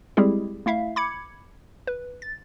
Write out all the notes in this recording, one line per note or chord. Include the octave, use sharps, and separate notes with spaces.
G3 G#3 C4 E4 G4 G#4
A3 E4 E5 F5
B5 D6 G#6 C#7
B4
A6